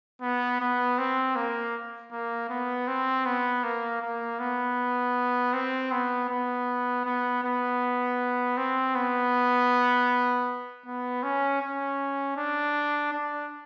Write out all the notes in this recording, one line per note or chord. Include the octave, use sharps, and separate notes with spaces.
B3
B3
C4
A#3
A#3
B3
C4
B3
A#3
A#3
B3
C4
B3
B3
B3
B3
C4
B3
B3
C#4
C#4
D4
D4